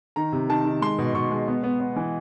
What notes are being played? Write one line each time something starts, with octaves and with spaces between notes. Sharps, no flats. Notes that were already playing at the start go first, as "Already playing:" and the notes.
D#3 A#5
C3
D#3 A5
D#3
G#3 C6
B2
B2 C#6
G#3
B3
B3
B3
E3